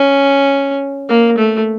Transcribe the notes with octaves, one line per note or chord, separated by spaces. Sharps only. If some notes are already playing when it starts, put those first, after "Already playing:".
Already playing: C#4
A#3
A3